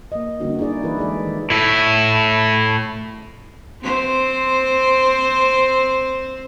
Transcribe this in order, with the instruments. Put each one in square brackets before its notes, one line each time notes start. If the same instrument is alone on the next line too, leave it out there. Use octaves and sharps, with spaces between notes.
[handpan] A#3 D#5
D3 G3 A#3 C#4 D#4 F#4
D#4 E4 G#4 D5 D#5
E3 E4 A#4 B4
G#3 G#4 A4 D5
D#3
[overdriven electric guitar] A2 E4
[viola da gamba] C4 C5